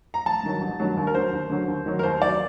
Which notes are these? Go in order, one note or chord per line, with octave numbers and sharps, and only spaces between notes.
A#5
A1 A5
G2 D#3 F#3
A1
G2 D#3 F#3
D#2
A#4
D3 F#3 C5
D#2
D3 F#3
D#2
D#3 F#3
A#4
D#2 C5
D#3 F#3 D5